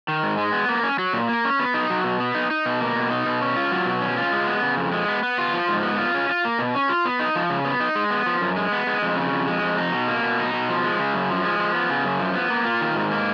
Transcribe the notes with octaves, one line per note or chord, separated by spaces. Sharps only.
D#3
G#2
G#3
B3
A#3
C#4
F#3
A#2
A#3
C#4
B3
D#4
F#3
B2
B3
D#4
D#4
B2
A#3
B2
D#4
B2
C#4
F4
F#3
B2
C#4
F4
G#3
B3
C#3
F2
G#3
B3
B3
F4
F3
G#2
B3
F4
C#4
F4
A#3
B2
C#4
F4
B3
D#4
F3
C#3
B3
D#4
G#3
B3
F3
F#2
G#3
B3
G#3
F2
C#3
F2
G#3
F2
D#4
B2
A#3
B2
D#4
B2
F3
G#3
C#3
F#2
F3
G#3
F3
B3
C#3
F#2
F3
B3
A#3
F4
D#3
G#2
A#3